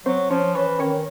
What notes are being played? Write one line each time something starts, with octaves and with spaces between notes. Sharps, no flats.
F#3 C4 C5
F3 C#4 C#5
E3 C#4 C#5
D#3 C#4 C#5